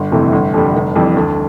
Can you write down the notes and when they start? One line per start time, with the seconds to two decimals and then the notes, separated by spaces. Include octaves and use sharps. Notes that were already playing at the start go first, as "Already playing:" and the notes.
Already playing: G1
0.12 F2 C3 E3 A3
0.32 G1
0.54 F2 D3 G3
0.75 F1
0.96 F2 E3 G3
1.17 D2